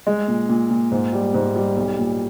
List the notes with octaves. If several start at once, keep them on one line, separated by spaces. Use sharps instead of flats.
G#3
A#2
A#2
A#2
G#2
G3
G#2
G3
B1
A#2